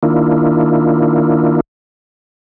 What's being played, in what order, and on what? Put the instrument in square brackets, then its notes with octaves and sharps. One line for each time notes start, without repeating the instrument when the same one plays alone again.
[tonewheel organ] D#3 A#3 D4 E4 F4